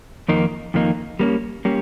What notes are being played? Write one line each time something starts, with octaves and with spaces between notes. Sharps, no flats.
F2 D#3 A#3 D#4
F2 D#3 A#3 D#4
G3 A#3 C#4
G3 A#3 C#4